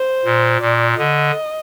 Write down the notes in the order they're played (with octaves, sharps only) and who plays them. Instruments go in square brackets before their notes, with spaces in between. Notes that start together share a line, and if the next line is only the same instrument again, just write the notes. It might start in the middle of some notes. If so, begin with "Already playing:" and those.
Already playing: [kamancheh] C5
[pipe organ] A#2
[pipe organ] A#2 [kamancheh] D5
[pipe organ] D3 [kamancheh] D#5